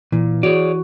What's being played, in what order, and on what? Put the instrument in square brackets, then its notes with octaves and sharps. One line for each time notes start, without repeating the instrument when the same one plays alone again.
[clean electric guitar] A#2 [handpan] E3
[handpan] F#4 [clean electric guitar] G#4 C#5 D5